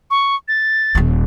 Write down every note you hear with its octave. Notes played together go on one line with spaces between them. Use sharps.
C#6
A6
D#1 D#2